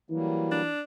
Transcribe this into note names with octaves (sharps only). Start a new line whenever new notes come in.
E3 F#3 G3 A#3
D4